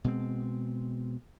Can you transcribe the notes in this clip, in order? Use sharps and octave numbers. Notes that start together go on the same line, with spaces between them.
B2 G#3 C4